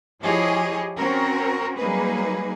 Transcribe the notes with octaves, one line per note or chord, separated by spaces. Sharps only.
F3 E4 G4 G#4 C#5 D#5
C4 C#4 F#4 A#4
F#3 G3 A#3 D#4 G#4 B4